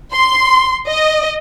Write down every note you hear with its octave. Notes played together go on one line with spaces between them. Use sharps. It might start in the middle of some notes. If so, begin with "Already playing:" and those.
C6
D#5